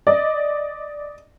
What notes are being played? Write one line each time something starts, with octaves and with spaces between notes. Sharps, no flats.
D5 D#5